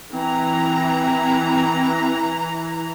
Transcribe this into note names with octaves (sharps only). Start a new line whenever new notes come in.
E3 C4 A#5